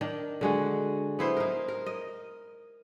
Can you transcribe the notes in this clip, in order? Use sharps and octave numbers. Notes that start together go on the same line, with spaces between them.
D#3 D4
D3 G#3 F#4
B3 E4 C5
D#4 A#4
A#4
D#5